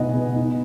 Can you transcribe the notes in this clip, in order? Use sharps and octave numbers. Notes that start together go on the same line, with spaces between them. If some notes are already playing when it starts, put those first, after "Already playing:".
Already playing: B2 B3 D#4 D#5 F#5 G#5
B3
D#4